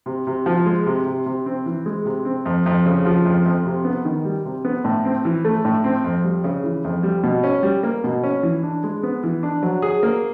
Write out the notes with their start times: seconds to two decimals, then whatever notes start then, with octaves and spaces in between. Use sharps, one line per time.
0.06 C3
0.27 C3
0.46 F3
0.66 G#3
0.86 C3
1.06 C3
1.26 C3
1.46 C4
1.66 E3
1.86 G#3
2.05 C3
2.25 C4
2.45 F2
2.66 F2
2.86 C#3
3.05 F3
3.25 F2
3.46 F2
3.66 C3
3.85 B3
4.05 D#3
4.25 G3
4.45 C3
4.65 B3
4.84 A2
5.05 C4
5.25 E3
5.45 A3
5.65 A2
5.84 C4
6.04 F2
6.24 G3
6.44 C#3
6.64 E3
6.84 F2
7.03 G3
7.23 B2
7.44 C#4
7.63 G3
7.83 A#3
8.04 B2
8.23 C#4
8.43 E3
8.63 D4
8.84 G#3
9.03 B3
9.24 E3
9.43 D4
9.63 F#3
9.82 G#4
10.03 A#3